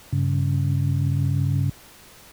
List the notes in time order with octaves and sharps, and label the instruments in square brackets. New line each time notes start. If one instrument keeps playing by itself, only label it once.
[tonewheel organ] G2 C#3